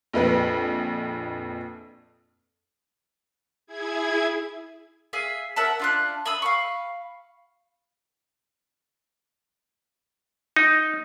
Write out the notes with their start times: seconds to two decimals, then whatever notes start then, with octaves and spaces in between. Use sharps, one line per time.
0.13 A#1 F2 B4
3.67 E4 G#4 G#6
5.13 G#4 E5 F5 G#5
5.56 A#4 E5 F#5 A5
5.79 D4 F4 F#6
6.26 E5 B5 D#6 E6
6.42 F5 B5 C#6
10.56 D#4